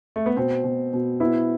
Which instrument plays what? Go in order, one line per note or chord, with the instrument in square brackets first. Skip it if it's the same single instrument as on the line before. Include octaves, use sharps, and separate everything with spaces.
[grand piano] A3
B3
[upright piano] B2 [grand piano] C4
[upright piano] B2
B2
[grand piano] B3 [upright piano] E4